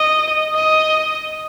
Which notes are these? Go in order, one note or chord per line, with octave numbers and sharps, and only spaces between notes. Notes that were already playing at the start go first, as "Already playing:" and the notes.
Already playing: D#5
D#5